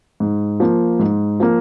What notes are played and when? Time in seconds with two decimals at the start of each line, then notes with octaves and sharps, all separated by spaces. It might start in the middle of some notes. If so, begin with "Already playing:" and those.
0.20 G#2
0.60 F3 A#3
0.99 G#2
1.40 F3 A#3